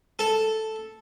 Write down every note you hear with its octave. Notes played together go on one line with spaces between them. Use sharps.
A4